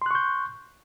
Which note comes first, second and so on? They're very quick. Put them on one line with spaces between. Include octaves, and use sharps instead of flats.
C6 F#6 C#6 G6